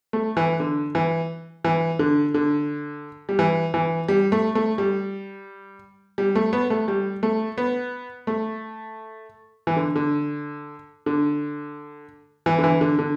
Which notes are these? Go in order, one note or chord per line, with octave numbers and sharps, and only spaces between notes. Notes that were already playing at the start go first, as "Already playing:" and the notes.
A3
E3
D3
E3
E3
D3
D3
G3
E3
E3
G3
A3
A3
G3
G3
A3
B3
A3
G3
A3
B3
A3
E3
D3
D3
D3
E3
D3
E3
D3
D3